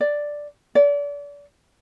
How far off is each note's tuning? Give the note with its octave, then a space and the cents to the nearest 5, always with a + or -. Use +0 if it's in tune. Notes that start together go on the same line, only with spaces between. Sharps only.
D5 +0
D5 -35